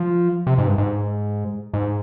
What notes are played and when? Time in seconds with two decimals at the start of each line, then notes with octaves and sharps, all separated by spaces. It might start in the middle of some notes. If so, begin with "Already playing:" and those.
Already playing: F3
0.47 C3
0.58 G#2
0.67 G2
0.78 G#2
1.74 G#2